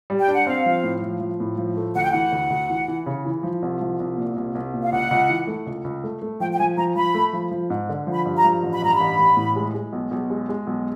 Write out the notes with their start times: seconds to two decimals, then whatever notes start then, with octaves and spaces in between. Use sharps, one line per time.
0.10 G3
0.20 G5
0.28 D4
0.33 F#5
0.46 C4 F5
0.66 F3
0.84 A2
1.02 F3
1.20 F3
1.40 A2
1.58 F3
1.77 A3
1.95 D2 F#5
2.03 G5
2.12 E3 F#5
2.32 D2
2.50 D2
2.69 E3
2.88 E3
3.06 C#3
3.25 E3
3.43 F3
3.62 C2
3.81 F3
4.00 C2
4.17 A#2
4.36 C2
4.55 C2
4.74 A#2
4.82 F5
4.92 C#2 F#5
5.11 C#2
5.29 E3
5.47 A3
5.66 C#2
5.84 C#2
6.04 A3
6.22 A3
6.40 F3 G5
6.53 G5
6.59 F3 G#5
6.77 F3 A#5
6.96 F3 B5
7.14 A3
7.33 F3
7.51 F3
7.70 G#2
7.89 D3
8.07 F3
8.13 B5
8.26 G2
8.38 A#5
8.44 F3
8.63 A1
8.73 B5
8.82 G2 A#5
8.94 B5
9.00 A1
9.19 A1
9.37 A2
9.56 G#3
9.74 G#3
9.93 B1
10.11 B1
10.30 G#3
10.49 G#3
10.67 B1